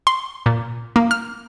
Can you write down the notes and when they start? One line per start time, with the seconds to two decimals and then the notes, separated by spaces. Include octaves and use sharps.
0.07 C6
0.46 A#2
0.96 A#3
1.11 F6